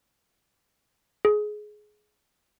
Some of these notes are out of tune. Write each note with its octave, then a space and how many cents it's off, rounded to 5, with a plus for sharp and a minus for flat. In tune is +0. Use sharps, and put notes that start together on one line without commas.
G#4 +20